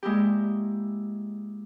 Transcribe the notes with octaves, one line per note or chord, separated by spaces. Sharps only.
G#3 A#3 E4 G4